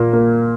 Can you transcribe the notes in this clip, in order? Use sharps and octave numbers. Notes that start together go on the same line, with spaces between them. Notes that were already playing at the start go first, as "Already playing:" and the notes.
Already playing: A#2 A#3
A#3